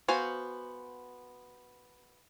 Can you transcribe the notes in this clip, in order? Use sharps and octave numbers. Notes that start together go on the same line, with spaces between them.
B3 F#4 C5 F5 G#5